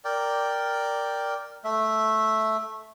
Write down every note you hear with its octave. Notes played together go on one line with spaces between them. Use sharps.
A#4 D5 G5
A3 E5